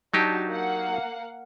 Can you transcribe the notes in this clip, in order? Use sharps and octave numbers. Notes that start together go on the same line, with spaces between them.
F#3 D4 D#4 F#4 G4 A5
A#3 F5 F#5